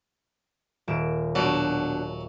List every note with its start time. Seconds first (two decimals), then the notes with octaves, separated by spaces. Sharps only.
0.88 D#1 D7 E7
1.35 B2 F#3 D4